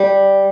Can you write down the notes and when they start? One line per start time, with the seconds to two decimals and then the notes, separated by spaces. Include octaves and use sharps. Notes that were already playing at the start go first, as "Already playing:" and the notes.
Already playing: G3